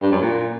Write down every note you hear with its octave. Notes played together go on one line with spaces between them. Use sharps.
G2
F#2
A#2